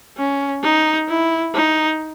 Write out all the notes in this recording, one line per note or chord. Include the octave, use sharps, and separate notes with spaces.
C#4
D#4
E4
D#4